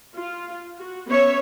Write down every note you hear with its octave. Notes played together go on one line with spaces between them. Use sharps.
F4
F#4
B3 C#4 C#5 E5